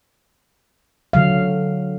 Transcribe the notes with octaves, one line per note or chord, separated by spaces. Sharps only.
D3 F#3 F5